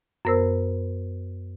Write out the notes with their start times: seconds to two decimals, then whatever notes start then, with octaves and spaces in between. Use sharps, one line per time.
0.25 F#2 B3 A#4 C5 E6